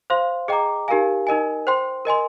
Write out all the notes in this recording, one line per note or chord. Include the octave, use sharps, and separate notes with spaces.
C5 F5 C6
G#4 D#5 G5 A#5 D6
D#4 G4 A#4 F5 G#5
D#4 A#4 D#5 G#5
C5 G5 C6
A#4 D#5 G#5 C6